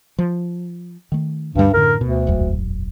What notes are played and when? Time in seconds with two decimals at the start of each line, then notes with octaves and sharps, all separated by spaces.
0.18 F3
1.12 D#3 A3
1.55 D2 G2 G3
1.74 F#2 A2 D3 A#4
2.01 D2 B2
2.27 E1 A#1 F#2